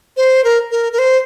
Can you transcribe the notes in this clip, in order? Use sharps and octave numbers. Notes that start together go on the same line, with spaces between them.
C5
A#4
A#4
A#4
C5